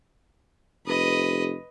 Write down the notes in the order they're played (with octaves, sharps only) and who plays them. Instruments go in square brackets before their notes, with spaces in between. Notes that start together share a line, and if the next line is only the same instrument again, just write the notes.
[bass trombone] F1 [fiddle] B4 D#5